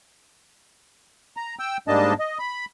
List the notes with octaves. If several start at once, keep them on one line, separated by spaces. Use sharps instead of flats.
A#5
G5 E6
G#2 G3 A#3 D4 D#5 A5
D#5
B5